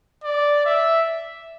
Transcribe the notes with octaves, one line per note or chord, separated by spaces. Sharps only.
D5
E5